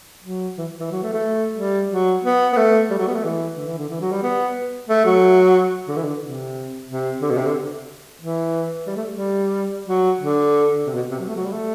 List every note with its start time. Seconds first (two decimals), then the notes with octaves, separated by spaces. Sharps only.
0.24 F#3
0.58 E3
0.80 E3
0.92 F#3
1.03 A3
1.13 A3
1.58 G3
1.90 F#3
2.24 B3
2.53 B3
2.57 A3
2.90 G3
2.98 F#3
3.07 B3
3.15 A3
3.24 E3
3.57 D3
3.67 E3
3.78 D3
3.89 E3
4.01 F#3
4.11 G3
4.23 B3
4.89 A3
5.06 F#3
5.88 D3
5.97 E3
6.03 D3
6.22 C3
6.88 C3
7.22 D3
7.30 B2
7.37 C3
7.46 D3
8.22 E3
8.87 G3
8.96 A3
9.12 G3
9.88 F#3
10.20 D3
10.87 C3
10.94 B2
11.11 C3
11.20 F#3
11.28 A3
11.36 F#3
11.45 G3
11.53 A3